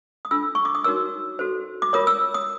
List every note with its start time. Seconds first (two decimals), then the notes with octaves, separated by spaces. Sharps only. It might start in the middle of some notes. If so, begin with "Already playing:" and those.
0.25 D#6
0.31 D4 F4 A4 E6
0.55 C#6
0.65 D6
0.75 D#6
0.84 D#4 F#4 A#4 C#5 E6
1.39 F#4 A4 C5
1.82 D6
1.93 F4 A#4 C#5 D#6
2.07 E6
2.34 D#6